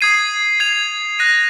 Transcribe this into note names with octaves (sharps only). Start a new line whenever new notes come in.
D#6 G#6 C7 D#7
G#6 C7 F7
F#6 A#6 D#7